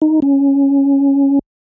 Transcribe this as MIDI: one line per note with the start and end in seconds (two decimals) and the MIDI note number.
0.02 0.20 63
0.22 1.39 61